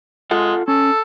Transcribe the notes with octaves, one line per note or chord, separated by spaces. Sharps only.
G#3 F4 A4 F#5
C#4 A4